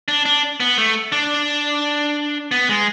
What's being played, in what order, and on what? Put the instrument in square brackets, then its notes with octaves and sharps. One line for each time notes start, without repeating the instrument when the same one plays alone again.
[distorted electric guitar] D4
D4
B3
A3
D4
B3
G#3